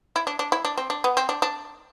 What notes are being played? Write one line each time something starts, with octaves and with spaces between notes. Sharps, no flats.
E4
D4
D4
E4
D4
C4
D4
B3
C4
D4
D4